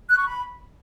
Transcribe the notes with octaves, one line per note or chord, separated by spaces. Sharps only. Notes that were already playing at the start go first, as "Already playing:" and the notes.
F#6
C#6
B5